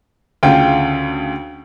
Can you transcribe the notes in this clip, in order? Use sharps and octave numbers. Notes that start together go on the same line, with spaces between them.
D2 C#3 F4 G5